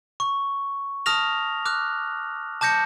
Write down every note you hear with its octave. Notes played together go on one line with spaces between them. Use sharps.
C#6
A5 D#6 F6 A#6 F7
D6 F6 F#6
A5 D6 G6 A#6 C#7